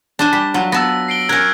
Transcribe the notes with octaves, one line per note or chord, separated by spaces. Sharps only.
D4 C5 G#5
G3 B6
F#3 F4
B3 A5 E6 A#6
C7 D7 G7
C#4 A#4 F6 F#6 G#6